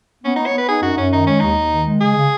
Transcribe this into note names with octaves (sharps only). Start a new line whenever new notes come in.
B3 C#4
D#4
B3
C#5
B3 B4
D#4 G#4
F#2 F#4
F#2 C#4
D#3 D#4
G#3 C#4
D#2 D#4
D#2
D#3
G#3
C#3 G#4
C#3